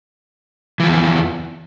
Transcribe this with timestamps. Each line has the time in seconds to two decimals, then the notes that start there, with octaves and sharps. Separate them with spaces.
0.80 E3
0.84 F3
0.88 E2